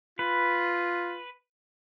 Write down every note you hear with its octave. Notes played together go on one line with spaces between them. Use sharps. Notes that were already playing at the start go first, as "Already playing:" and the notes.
F4 B4